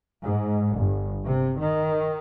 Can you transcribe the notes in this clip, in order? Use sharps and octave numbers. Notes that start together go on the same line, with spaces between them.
G#2
G1
C3
D#3